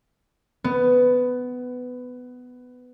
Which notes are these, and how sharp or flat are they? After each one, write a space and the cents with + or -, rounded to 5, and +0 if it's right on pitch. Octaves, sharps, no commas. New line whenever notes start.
B3 +15